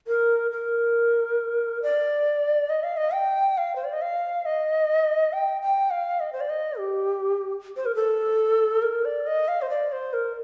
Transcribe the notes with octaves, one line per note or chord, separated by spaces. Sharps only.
A#4
A#4
D5
D#5
F5
D#5
G5
F5
C5
D5
D#5
F5
D#5
G5
G5
F5
D#5
C5
D5
D#5
G4
C5
A#4
A4
A#4
D5
D#5
F5
C5
D5
C5
A#4